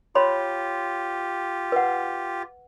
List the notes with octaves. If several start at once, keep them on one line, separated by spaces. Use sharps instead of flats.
F4 G4 C#5 B5 C6
B4 F#5